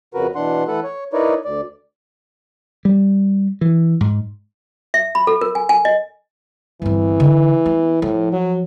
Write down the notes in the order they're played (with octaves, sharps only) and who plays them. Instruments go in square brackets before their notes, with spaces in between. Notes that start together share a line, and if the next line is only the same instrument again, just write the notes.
[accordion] F2 C#3 F#4 A#4 B4
B2 E3 D4 F#5 C6
E3 A3 A4 B4 F#5
C#5
D#4 E4 A#4 B4 C#5 D5
D2 D5
[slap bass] G3
E3
G#2
[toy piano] E5
B5
A4
A#4
G#5
G#5
D#5
[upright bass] G1 C4 [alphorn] E3
[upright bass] D3
B3
[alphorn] A2 [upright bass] F3
[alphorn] F#3